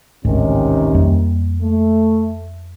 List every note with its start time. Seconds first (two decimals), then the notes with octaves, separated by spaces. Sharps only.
0.25 A1 D2 G#2 C3 D#3 C#4
0.95 F2 G3 A#3
1.61 A3